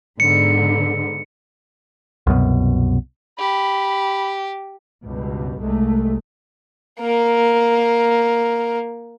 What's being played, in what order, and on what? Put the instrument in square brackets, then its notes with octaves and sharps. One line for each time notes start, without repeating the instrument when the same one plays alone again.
[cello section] G#2 D3 B3 [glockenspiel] C#7
[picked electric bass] C2 F#2 B2
[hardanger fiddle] G4 [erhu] B5
[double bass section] C#2 G2 B2
C2 G#3 A3
[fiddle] A#3 A#4